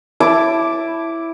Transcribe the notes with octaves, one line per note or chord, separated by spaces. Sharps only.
E4 A5 D6